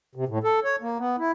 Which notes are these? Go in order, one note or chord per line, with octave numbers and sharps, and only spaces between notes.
C3
A2
A4
C#5
A#3
B3
E4